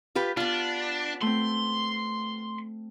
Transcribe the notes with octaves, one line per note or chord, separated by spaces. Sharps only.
F4 G4 B4
B3 D4 F4
A3 C4 C6